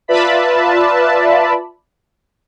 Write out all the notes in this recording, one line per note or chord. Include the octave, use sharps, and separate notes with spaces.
F4 B4 D5 E5 A5 B5